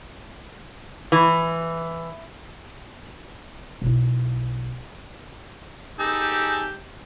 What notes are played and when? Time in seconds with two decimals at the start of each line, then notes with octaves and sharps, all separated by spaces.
1.12 E3
3.82 B1 E4
5.99 D#4 G4 G#4 A5 E6